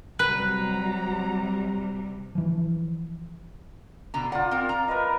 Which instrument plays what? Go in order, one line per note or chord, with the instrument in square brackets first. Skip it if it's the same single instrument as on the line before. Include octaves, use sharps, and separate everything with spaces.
[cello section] C3 G3 [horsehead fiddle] F#3 A#5 [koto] B4 [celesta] F#6
[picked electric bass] E3 F3
[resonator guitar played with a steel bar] B2 D3 A#5
[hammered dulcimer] F4 D5 [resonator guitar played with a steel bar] F#5
[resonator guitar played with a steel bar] C4 A#4
A#5
[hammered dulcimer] A#4 B4 D#5